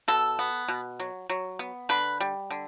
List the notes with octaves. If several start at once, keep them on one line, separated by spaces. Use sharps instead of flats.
B2 A4
B3
B2
F#3
F#3
B3
D3 B4
G3
D3